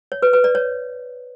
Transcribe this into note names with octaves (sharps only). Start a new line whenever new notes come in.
C#5
B4
B4
D5
C#5